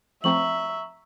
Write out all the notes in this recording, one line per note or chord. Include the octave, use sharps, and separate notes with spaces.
F3 A3 C4 E5 A#5 C#6 F#7